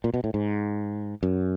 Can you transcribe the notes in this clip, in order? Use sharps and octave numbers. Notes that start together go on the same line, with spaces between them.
A#2
B2
A2
G#2
F#2